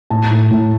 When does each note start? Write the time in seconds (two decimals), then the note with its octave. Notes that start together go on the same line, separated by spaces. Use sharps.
0.10 A2 A5
0.31 A2
0.51 A2